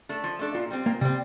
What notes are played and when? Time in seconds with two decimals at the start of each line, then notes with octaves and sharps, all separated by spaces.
0.09 A3 D4 A4
0.24 F3
0.39 A3 D4 A4
0.55 A#2 F4
0.70 G3 C4
0.86 A#2 A#3
1.01 C3 G3 C4